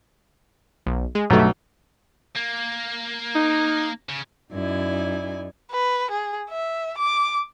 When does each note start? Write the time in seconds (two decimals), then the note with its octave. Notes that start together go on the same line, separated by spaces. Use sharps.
0.86 B1
1.15 G#3
1.30 B1 G2 A3
2.36 A#3
3.35 D#4
4.09 C#3
4.51 F#2 D#4 E4 D5 G#5
5.71 B4
6.11 G#4
6.50 E5
6.98 D6